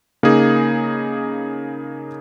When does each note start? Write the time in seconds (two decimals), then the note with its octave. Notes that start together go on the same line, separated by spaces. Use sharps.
0.23 C#3 A#3 D#4 G#4